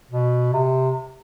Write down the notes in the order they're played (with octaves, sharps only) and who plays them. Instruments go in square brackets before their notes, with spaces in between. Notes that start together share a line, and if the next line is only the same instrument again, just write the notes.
[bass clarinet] B2
C3